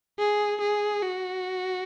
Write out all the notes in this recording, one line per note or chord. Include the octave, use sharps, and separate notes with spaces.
G#4
G#4
F#4